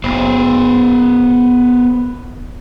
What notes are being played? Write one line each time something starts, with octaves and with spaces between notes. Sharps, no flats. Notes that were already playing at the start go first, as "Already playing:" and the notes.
F#1 B3 C5